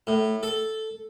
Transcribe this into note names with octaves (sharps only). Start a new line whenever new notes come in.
A2
A4